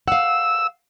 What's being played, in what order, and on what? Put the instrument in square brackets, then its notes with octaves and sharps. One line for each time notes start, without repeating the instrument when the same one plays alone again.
[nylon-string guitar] F5 F#5 [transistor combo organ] E6